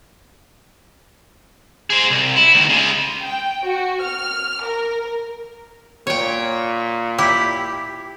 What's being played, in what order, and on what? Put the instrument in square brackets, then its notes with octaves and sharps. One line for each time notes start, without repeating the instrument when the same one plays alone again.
[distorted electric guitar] G#4 C5
C2
E4
D2 D#3
C#3 G#3
[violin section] G5
F#4
F6
A#4
[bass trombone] A#2 [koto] C#5 G5
[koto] E4 G4